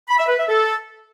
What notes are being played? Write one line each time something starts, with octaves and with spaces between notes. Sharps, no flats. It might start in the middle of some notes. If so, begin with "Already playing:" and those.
B5
E5
B4
E5
A4